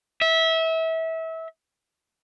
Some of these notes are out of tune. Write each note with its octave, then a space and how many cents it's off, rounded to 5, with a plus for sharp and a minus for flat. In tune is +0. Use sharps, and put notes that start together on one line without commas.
E5 -25